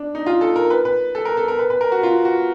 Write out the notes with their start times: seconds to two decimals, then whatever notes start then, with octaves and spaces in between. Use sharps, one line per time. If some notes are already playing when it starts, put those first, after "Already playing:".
Already playing: D4
0.15 D#4
0.26 F4
0.41 A4
0.56 A#4
0.70 B4
0.85 B4
1.15 A4
1.25 A#4
1.37 A4
1.48 A#4
1.59 B4
1.70 B4
1.81 A#4
1.92 F#4
2.03 F4
2.25 F#4